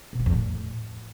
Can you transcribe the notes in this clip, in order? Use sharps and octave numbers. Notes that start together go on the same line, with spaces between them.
B2
F3
E2
A2